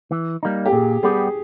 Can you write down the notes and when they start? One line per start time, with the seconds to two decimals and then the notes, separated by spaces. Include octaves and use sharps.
0.12 E3
0.43 G3 A#3 D#4
0.66 G4
0.72 A#2 G#4
1.03 G3 B3 G4 G#4